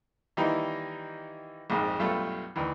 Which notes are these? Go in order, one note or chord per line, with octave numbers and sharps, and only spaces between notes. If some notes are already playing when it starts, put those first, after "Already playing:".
D#3 E3 G3 A#3 D#4 E4
A#1 F2 G#2
B1 G2 A3 F4 A4
D2 D#3 E3